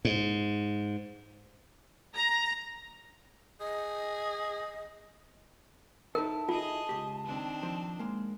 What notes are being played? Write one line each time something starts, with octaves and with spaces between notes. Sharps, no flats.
G#2
A#5
G#4 D#5
D#4 E4 A4 A#4 A5
F4 G#4 D#5
C#2 G4
D#3 C4 D4
F3
G#3 A#3